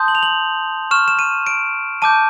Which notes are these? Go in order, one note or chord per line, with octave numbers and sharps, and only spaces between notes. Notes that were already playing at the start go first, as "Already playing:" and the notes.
Already playing: A5 C6 D#6 G6
F#7
F7
F#7
C#6 F6 E7
E7
D#7
D7
A5 D6 G6 D#7